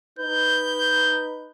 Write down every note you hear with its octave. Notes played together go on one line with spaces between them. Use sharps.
D#4 B4 G6